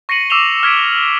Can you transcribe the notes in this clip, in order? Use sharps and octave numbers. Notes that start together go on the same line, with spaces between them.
C#6 A#6 C7 C#7 D#7 F#7
D6 E6 C7 E7 F7 G7
F6 G#6 B6 D7 D#7
F#7